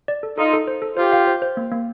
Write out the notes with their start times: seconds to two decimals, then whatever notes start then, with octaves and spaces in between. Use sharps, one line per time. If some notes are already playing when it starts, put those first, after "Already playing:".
0.08 D5
0.23 A4
0.37 D#4 F4 A4
0.53 A4
0.67 C5
0.82 A4
0.97 F4 G4 C5
1.12 F5
1.27 C5
1.42 C5
1.57 A#3
1.72 A#3